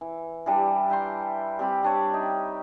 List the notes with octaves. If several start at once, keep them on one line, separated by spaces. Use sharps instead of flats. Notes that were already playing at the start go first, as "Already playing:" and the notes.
E3
E3 G3 D4
E5 G5 A#5 C6
G3 C4 G4 B5
G3 D4 C#5
D#4 E5